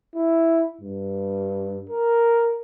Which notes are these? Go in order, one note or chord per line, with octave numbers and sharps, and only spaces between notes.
E4
G2
A#4